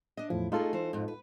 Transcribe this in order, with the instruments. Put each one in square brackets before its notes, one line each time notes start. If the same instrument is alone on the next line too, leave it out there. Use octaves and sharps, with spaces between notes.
[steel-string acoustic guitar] D4 D#5
[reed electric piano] E2 A2 F3 [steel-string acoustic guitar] E4
[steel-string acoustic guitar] A3 G#4 D#5 [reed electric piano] D#4 F4 A4
[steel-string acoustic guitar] E3 C5
F2 G#2
B4